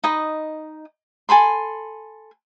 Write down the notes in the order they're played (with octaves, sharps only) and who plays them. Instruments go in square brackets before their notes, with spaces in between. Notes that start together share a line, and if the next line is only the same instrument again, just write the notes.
[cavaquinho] D#4 D#5 B5
A4 G#5 B5 C6